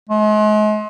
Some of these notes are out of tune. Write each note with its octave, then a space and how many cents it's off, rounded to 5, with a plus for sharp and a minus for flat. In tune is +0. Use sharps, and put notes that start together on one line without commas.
G#3 +40